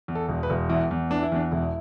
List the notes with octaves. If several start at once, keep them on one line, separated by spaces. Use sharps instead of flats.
E2
A4
E1
B4
E1
E2 E4
E2
E3 D4
E4
E2 D4
E1 E4